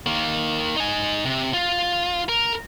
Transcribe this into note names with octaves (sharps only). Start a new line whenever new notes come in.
D#3 A#3
D#4 G#5
C3
F4
A#4